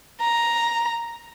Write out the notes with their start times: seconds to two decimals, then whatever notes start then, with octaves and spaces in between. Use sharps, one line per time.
0.21 A#5